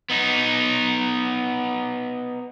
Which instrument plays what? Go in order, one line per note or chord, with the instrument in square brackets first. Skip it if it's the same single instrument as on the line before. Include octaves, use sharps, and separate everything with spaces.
[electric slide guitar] B3 D#4